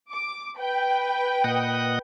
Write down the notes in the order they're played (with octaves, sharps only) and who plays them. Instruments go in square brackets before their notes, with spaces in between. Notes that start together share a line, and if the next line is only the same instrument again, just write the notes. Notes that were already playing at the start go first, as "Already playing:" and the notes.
[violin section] D6
B4 G5
[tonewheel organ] A#2 D#5 F#5